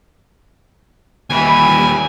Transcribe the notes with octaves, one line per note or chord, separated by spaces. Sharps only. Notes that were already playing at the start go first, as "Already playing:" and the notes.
D#2 E3 G3 G#5